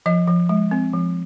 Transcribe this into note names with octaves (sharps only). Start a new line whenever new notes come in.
F3 D#5
F3
G#3
C4
F3